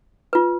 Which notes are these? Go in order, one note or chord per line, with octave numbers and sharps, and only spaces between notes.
F4 B4